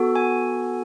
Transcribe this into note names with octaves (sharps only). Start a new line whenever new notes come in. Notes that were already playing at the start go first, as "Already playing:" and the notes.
Already playing: B3 F#4 A4
G#5